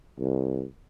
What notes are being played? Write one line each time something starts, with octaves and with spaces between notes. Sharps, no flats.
C2